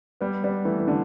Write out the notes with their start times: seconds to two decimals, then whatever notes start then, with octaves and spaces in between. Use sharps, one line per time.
0.21 G3 B3
0.44 G3 B3
0.65 E3 A3
0.80 E3
0.88 D3 G3